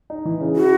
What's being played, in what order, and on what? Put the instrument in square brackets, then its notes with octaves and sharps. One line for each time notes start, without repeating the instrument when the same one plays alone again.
[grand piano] D#4
E3
C#3
[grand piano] E4 [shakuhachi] F#4